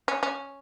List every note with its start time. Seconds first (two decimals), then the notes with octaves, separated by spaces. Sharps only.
0.08 C#4
0.23 C#4